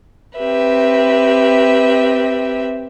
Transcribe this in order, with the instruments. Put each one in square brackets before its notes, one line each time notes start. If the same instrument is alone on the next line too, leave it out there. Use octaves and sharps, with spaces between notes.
[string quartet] C4 G4 B4 E5